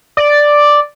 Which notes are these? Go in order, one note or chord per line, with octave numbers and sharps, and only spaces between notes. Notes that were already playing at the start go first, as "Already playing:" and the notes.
D5